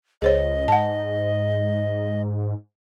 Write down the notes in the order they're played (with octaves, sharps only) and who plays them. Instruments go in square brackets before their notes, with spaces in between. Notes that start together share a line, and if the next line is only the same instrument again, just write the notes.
[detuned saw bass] C#2 [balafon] G#4 C5 C#5 [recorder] D#5
[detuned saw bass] G#2 [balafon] F#5 A5